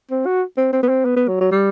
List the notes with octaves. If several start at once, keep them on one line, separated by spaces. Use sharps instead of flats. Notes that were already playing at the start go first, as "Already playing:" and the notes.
C4
F#4
C4
C4
B3
C4
B3
B3
F#3
F#3
G3